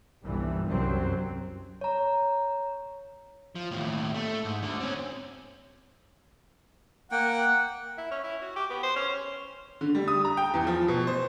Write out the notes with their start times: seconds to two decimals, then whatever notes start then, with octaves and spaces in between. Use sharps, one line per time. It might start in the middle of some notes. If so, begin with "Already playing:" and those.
0.24 G1 C2 G2 A#2 E3
0.66 C2 F#2 F#3 C4
1.81 C#5 A#5
3.55 F3
3.71 D#2 A2
4.14 A3
4.45 G#2
4.63 D2 D3
4.80 C4 C#4
7.12 A#3 F#5 G5
7.98 E4
8.11 C#4
8.24 E4
8.42 F#4
8.56 G4
8.70 B3
8.83 C5
8.96 C#4
9.09 C#4
9.81 D3
9.95 G3
10.08 D#6
10.25 A#5
10.37 G5
10.54 E2
10.67 F3
10.88 B2
11.07 C5